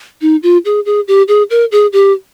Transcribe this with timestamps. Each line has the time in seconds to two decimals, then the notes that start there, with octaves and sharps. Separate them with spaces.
0.21 D#4
0.43 F4
0.65 G#4
0.85 G#4
1.08 G4
1.28 G#4
1.50 A#4
1.72 G#4
1.93 G4